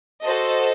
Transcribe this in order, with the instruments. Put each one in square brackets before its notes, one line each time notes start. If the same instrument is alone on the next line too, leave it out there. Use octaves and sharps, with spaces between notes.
[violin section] F#4 A4 C5 D#5